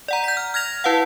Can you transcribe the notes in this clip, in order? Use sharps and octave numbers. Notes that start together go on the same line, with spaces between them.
D5 F#5 A#5
G6 B6
F6
F6 G#6 A#6 F7
E4 B4 F5 F#5